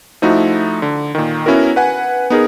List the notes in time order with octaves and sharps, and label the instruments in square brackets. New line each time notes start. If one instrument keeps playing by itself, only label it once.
[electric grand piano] F3 A3 D#4 E4 F#4
D3
A#2 D#3
B3 C#4 E4 F#4 A#4
B4 F#5 G#5
B3 D#4 G#4 A#4